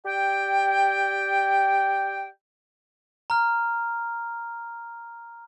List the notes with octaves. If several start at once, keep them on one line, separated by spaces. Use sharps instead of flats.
G4 D5 G5
A#5 F6